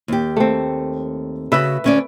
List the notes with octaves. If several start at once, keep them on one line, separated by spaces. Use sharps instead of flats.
D#2 G4
A3 C4
C#3 F#4 B4 E5
D2 C#4 D5